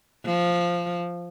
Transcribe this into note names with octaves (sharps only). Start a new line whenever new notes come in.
F3